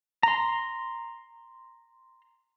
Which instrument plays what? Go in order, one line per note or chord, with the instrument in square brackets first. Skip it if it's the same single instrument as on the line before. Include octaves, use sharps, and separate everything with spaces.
[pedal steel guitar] A#5 C6